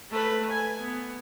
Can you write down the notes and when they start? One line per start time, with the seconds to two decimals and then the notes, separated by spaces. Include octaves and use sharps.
0.11 A3 B4
0.51 G#5
0.79 B3